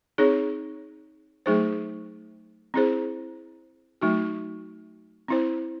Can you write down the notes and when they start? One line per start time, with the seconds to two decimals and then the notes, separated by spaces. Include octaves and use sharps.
0.18 C4 D#4 G#4 C#5
1.46 F#3 A3 D#4 G#4 C5
2.74 C4 E4 G#4 C5
4.01 F#3 A3 D#4 F#4
5.28 C4 E4 C5